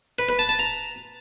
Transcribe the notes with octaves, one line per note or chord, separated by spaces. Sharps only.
B4
B4
A5
A5
A#5